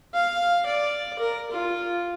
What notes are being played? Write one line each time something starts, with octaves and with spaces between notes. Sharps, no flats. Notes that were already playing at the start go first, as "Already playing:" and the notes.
F5
D5
A#4
F4